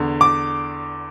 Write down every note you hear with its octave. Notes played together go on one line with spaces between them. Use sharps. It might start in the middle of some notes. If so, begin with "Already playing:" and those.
Already playing: E2 D3
D6